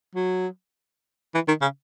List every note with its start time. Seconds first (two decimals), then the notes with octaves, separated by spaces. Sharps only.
0.15 F#3
1.35 E3
1.48 D#3
1.62 C#3